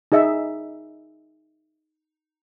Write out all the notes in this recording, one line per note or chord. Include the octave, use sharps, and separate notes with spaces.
D#4 G#4 D#5 E5